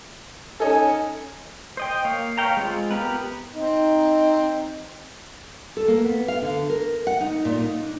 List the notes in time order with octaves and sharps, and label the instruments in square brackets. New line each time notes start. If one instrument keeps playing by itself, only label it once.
[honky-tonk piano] C#4 D#4 A4 [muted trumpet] G#5
[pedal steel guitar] C5 D#5 G5
A#3 C#5 F5
B4 C#5 F5 G5 A#5
G#3 C4 F4
B3 G4 A#4 B4
[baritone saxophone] C4 [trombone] D#4
[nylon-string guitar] A4
A#3
B3
F5
D3
A#4
F#5
D#4
A#2
D#4
D4